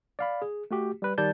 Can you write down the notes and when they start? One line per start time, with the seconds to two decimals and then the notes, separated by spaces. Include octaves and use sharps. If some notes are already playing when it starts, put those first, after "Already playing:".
0.19 D5 F5 B5
0.42 G#4
0.71 A3 F#4 G4
1.02 G3 B4
1.18 D#3 G3 D5 A5 G6 A6